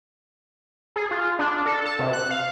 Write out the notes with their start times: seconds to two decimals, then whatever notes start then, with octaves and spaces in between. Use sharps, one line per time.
0.96 G#4
1.11 F4
1.39 D4
1.66 A4
1.85 A5
1.99 C3
2.13 F#6
2.30 F5